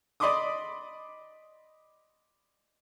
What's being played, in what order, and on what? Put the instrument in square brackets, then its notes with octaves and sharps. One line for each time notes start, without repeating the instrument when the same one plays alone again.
[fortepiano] D5 D#5 B5 C6 D6 D#6